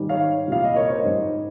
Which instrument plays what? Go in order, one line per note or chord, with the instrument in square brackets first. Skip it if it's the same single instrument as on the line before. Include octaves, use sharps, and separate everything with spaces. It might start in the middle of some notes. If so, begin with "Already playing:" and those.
Already playing: [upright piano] G#2 D#3 G3
C#5 F5
C2 A#2 G3 F5
D#5
A#4 C#5
C5 D#5
G#2 G3